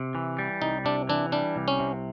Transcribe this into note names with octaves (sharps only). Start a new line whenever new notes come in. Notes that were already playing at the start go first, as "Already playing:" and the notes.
Already playing: C3
E3
G3
C2 D#4
C3 D4
E3 D4
G3 D4
C2
C#4
C3